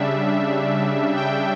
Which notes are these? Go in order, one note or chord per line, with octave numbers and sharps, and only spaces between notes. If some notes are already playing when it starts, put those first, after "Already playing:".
Already playing: C#3 G3 D4 E5
G5